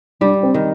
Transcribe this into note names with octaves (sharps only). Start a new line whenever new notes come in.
G3 D4
C4
D#3